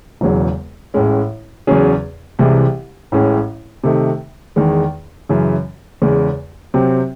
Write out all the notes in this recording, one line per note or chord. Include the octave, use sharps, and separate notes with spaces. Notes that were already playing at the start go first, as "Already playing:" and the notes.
E1 E2 C#3 F#3
A1 A2 G#3 C#4
E2 C#3 F#3 C#4 G#4
C2 C3 E3 G#3
A1 A2 G#3 C#4
C3 D#3 A3 D#4
E2 D#3 G#3
F#2 C#3 E3
E2 C#3 G#3
C3 F#3 C4